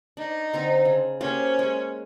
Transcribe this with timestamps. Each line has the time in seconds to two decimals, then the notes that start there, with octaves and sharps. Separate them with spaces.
0.17 D4 D#4
0.54 D3 C4 A#5
0.85 C#3
1.21 A#3 C#4 G4 C5
1.59 G#3